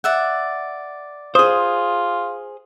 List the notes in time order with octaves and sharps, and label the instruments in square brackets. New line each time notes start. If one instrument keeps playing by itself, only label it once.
[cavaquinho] D5 E5 F#5
[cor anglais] F4 [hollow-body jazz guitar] G#4 C5 [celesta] D#6